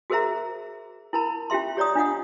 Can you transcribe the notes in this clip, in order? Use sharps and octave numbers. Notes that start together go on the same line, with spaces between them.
F#4 G#4 A#4 C5 E5 A#5
E4 A#4 A5 B5
C#4 F4 G4 E5 C6
G4 C#5 D5 A#5 D#6
D4 F4 D#5 F#5 D#6